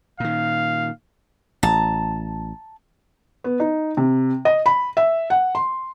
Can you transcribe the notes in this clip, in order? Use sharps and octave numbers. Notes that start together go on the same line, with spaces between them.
A#2 D#3 F5
A1 A5 A#5
B3
D#4
C3
D#5
B5
E5
F#5
C6